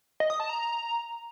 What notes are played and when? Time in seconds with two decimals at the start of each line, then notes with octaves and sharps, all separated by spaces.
0.20 D#5
0.30 D#6
0.40 A5
0.49 A#5